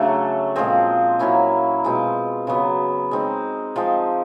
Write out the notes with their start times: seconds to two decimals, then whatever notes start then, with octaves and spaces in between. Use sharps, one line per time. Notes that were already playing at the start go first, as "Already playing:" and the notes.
Already playing: C#3 F#3 A3 D4
0.56 A#2 F3 G#3 C4
1.19 F#3 A#3 C#4 E4
1.84 B2 G#3 C4 F4
2.47 C#3 F#3 B3
3.11 G#3 C4 D#4
3.76 F3 G#3 C4